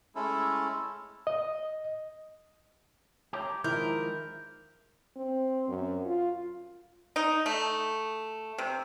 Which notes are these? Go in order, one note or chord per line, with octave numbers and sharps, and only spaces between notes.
G#3 A3 C#4 E4 A4
D#5
G4 C#5 A#5
D#3 F3 G#3 E4 A#4 G6
C4
F#2
F4
D#4
A3
C3